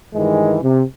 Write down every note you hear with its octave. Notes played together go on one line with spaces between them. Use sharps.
G2 D#3 E3 G#3
C3